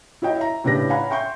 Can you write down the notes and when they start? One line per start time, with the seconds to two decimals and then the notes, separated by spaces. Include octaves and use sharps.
0.22 E4 F#4 C#5 D#5 G5
0.37 E5 A#5
0.64 A2 C#3 D4 G4 B4 A#6
0.89 C#5 F5 F#5 G#5 A#5 B5
1.10 E5 G5 C6 C#6 G6